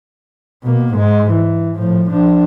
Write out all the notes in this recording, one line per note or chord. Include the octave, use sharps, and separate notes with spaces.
B2 A#3
G#2 G#3
E3
A2 F3
F3 D4